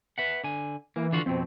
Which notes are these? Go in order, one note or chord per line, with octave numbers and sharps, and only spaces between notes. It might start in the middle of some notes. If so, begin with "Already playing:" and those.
B4 E5 F#5
D3 G#5
E3 A#3
D3 F4 F#4
F2 B2 C4